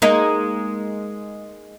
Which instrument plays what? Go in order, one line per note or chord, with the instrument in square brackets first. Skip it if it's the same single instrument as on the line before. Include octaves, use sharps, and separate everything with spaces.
[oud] G#3 A#3 D#4